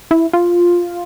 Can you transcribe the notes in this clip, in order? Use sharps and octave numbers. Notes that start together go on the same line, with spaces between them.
E4
F4